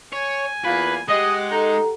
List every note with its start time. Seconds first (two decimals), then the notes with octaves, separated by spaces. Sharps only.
0.13 C#5 G#5
0.65 E2 A#3 F4 B4
1.08 G#3 G4 D#5 F#5
1.51 D#4 A4 A#5